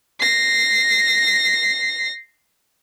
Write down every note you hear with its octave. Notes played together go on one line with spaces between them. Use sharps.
A#6 C7